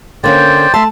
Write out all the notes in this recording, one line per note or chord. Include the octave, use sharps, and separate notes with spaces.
D3 A#3 C#4 C5 D5 G5
A3 E5 A5 C6